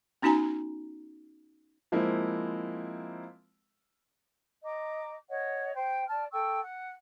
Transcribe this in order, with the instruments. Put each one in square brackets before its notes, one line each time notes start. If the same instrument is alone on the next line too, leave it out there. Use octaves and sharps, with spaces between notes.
[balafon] B3 C#4 D#4 F#4 G#5 A#5
[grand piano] F3 G#3 A#3 C4 E4
[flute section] D#5 A#5 D6
C#5 D#5 F#5
C5 G5 G6
D5 A5 F6
A4 G5 C#6 E6
F#5